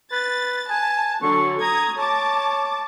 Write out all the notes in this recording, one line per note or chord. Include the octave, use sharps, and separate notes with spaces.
B4 A6
G#5 A5
D3 F#3 C#6
A#5 D#6 G#6
C#5 A5 D6